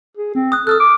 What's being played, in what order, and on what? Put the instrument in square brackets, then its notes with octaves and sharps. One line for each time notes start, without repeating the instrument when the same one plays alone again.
[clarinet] G#4
C4
[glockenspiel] D#6 F#6
[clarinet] A4 [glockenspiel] D#6 F6 F#6
[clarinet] D6